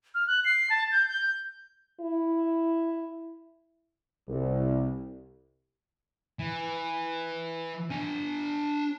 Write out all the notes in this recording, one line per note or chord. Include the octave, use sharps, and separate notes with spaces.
F6
F#6
C7
A5
G6
G6
E4
C2
E3
D4 G#5